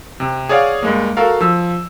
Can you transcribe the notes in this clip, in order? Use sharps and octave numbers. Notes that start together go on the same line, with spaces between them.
C3
G#4 C#5 D5 F5 F#5 F6
G2 G#3 A#3
F#4 A4 A#4 F5
F3 E6